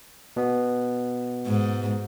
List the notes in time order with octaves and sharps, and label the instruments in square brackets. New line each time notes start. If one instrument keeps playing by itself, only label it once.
[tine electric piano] B2 B3
[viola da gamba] G#2